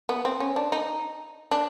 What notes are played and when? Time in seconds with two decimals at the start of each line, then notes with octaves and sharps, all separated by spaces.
0.09 B3
0.25 C4
0.40 C#4
0.56 D4
0.72 D#4
1.51 D4